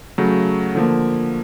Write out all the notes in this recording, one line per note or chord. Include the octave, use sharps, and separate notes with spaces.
C#3 F#3 A3
D3 F3 A#3